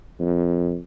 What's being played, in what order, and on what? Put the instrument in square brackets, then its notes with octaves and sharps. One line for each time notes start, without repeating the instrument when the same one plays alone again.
[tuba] F2